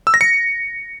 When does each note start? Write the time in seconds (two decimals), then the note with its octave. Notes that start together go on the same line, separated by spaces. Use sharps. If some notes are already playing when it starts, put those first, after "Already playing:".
0.07 E6
0.14 A#6
0.21 C#7